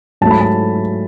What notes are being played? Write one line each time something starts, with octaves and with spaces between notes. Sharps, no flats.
G#2 F#3 A3 A5
B5
A5